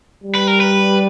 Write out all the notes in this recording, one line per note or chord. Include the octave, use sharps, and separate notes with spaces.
G3
B4
A#4
B4